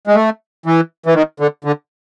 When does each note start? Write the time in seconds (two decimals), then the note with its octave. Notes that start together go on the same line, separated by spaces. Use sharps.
0.07 G#3
0.15 A3
0.66 E3
1.06 E3
1.15 D#3
1.40 D3
1.64 D3